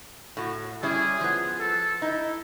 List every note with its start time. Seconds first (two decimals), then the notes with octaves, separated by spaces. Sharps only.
0.37 A2 F#4
0.83 G3 C#4 E4 G#4
1.21 F3 B3
1.60 A4
2.02 D#4 E4